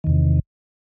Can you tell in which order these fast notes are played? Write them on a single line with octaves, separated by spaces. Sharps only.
D#3 E2 C3